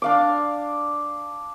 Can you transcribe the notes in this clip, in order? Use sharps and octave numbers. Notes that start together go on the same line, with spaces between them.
D4 F5 D6